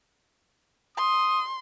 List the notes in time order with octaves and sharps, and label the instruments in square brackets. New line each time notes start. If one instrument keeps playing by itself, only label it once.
[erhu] C6 [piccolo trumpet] D#6